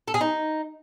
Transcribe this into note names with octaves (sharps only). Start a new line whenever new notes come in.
A4
G#4
D#4